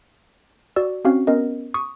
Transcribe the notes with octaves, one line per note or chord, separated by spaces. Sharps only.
F#4 D5 E6
C4 C#4 F#4 F5
B3 C#4 A#4 D#5
C#6 D#6